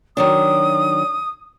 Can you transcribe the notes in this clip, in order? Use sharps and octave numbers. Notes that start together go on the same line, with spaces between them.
D#3 F#3 D4 D#6